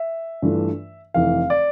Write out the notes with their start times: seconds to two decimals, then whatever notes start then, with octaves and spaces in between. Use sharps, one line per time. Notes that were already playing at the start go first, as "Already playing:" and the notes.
Already playing: E5
0.42 G2 E3 A3 D4 F4
1.14 F1 F2 E3 F5
1.50 D5